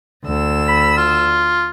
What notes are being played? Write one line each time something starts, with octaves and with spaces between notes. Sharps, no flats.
D2 E6
B5
F4